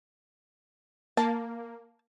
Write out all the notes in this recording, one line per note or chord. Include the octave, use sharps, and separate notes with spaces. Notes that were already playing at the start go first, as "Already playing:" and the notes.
A#3 A5